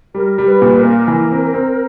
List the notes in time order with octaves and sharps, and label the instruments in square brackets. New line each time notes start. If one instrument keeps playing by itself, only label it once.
[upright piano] G3 [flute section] A#4
[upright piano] G3
[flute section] B4
[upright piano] A#2
[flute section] A#4
[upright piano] A#3
E3
C4
C4